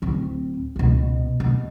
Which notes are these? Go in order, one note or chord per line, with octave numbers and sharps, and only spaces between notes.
D1 C4
C#2 B2
B2